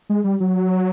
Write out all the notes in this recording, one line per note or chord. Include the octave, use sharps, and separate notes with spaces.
G#3
G3
F#3